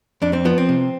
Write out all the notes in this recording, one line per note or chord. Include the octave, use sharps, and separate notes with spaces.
F2 D4
C4
F3 B3
C4
C3